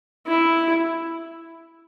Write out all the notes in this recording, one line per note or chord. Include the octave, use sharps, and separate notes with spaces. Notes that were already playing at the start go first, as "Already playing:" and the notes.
E4